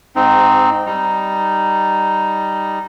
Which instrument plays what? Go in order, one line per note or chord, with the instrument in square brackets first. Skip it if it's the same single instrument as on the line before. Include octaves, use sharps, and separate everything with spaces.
[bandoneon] G#2 C4 D#4
G3 D#4